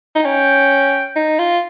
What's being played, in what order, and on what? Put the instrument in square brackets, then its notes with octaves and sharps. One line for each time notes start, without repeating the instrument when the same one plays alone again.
[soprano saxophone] D#4
[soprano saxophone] C#4 [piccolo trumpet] G5
[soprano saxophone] D#4
F4